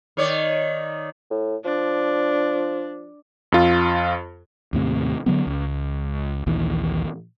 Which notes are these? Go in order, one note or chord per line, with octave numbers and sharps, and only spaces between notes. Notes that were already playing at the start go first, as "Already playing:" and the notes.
D#3 C#5 D5
A2
F3 D4
F2 F4
D#2 A2 C3
D3 F#3 B3
C#2
A#1 D#2 E3